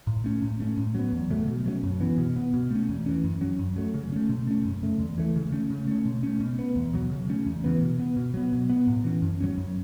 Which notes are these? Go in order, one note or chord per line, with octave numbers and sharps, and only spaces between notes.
A2
A3 C#4
A2
A3 C#4
A2
F#3 B3
E2
C#3 F#3 A3
B2
F#3 A3 C#4
F#2
E3 B3
B2
B3
B2
A3 C#4
E2
E3 C#4
F#2
F#3 C#4
F#2
F#3 A3
C#3
A3 C#4
B2
A3 C#4
F#2
C#3 A3
E2
E3 A3
C#3
A3 C#4
C#3
A3 C#4
B2
A3 C#4
B2
B3
E2
B2 F#3
C#3
A3 C#4
E2
C#3 E3 B3
B2
B3
B2
F#3 B3
B2
B3
A2
E3 C#4
F#2
F#3 A3 C#4
F#2